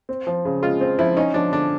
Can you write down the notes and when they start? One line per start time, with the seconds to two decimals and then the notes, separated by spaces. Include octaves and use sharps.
0.09 C4
0.27 F3
0.45 C#3
0.62 G#3 F4
0.81 C4
0.99 F3 E4
1.17 C#4 D#4
1.34 F3 D4
1.52 D3 D4